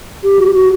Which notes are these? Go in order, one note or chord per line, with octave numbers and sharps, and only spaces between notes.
G4
F#4
G4
F#4